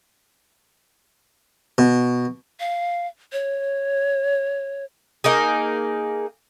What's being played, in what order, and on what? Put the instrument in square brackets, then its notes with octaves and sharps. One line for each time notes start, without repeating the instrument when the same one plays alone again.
[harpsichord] B2
[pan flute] F5
C#5
[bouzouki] A#3 D#4 G#4